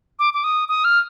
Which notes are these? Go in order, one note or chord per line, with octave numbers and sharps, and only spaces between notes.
D6
D6
D#6
D#6
F6